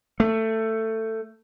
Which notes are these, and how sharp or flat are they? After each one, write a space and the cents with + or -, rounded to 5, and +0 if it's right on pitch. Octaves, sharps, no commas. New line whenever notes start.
A3 +15